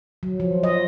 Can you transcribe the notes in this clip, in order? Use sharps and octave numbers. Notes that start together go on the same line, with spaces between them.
F#3
F3
D#5